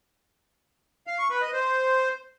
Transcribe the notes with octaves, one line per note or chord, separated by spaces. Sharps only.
F5
C#6
B4
D#5
C5